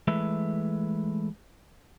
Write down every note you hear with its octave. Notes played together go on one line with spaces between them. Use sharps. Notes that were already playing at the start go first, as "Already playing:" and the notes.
E3 G#3 A3 B4 E5